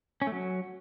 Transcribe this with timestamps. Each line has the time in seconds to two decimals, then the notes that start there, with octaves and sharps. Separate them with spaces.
0.22 C#4
0.27 A3
0.32 F#3